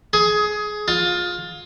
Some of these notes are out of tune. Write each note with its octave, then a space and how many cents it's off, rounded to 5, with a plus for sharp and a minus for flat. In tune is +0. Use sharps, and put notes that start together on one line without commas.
G#4 +20
F4 +20